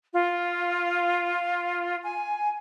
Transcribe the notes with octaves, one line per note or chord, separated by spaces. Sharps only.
F4
G#5